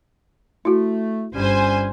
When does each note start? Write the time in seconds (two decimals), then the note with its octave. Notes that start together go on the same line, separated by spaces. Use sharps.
0.65 A3 E4 F#4
1.34 G1 G3 C#4 C5 G#5